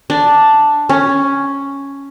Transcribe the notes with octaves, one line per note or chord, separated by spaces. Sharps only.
D4
C#4